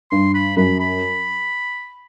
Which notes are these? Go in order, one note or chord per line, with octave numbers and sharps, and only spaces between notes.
G2 C6
B5
F#2 B5
B5